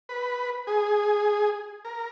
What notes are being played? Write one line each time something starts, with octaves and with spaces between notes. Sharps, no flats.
B4
G#4
A#4